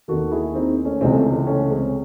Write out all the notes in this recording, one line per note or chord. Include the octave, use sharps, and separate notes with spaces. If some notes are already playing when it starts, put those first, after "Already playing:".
D#2 D#3 F#4 A4
E4 G#4
C4 D#4
A3 C#4
C#2 C3 E3 G#3 C4
A3
A3 C#4
G#3 C4